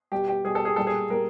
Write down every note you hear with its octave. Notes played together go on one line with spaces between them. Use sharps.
B2 G3 G4
G4
B2 G3 G#4
A4
G#4
A#2 G3 A4
G#4
A#2 G3 A#4